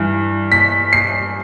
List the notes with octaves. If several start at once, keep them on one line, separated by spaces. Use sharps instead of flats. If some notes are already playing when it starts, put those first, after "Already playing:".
Already playing: G2 E3
B6
C7